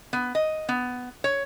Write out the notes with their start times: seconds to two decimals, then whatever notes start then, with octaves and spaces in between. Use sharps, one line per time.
0.13 B3
0.35 D#5
0.69 B3
1.24 C#5